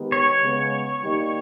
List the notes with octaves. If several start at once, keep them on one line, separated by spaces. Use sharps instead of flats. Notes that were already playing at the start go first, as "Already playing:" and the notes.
Already playing: D#3 G#3 B3 G4
C#5
C#3 G#3 B3
D#3 G3 A#3 D#4 G4